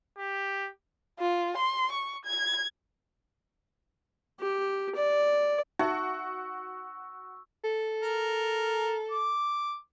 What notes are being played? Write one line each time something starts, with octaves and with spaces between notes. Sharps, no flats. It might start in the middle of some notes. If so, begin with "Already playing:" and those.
G4
F4
C6
C#6
G#6
G4
D5
D#4 F#4 E5 C#6 E6
A4
A#4
D6